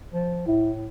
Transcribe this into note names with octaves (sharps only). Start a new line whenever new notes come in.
F3
A2 E4